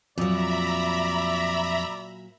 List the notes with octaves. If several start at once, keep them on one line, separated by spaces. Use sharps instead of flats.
F2 A#2 F#3 D5 E5 A#5 B5